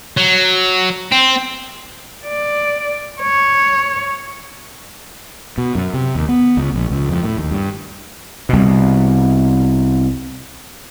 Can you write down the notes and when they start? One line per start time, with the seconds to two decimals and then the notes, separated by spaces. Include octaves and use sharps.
0.17 F#3
1.12 C4
2.26 D5
3.22 C#5
5.58 B2
5.75 F#2
5.94 C3
6.15 D#2
6.29 B3
6.57 C#2
6.74 A#1
6.90 C#2
7.09 F2
7.24 A2
7.38 D#2
7.51 G2
8.49 C2 B2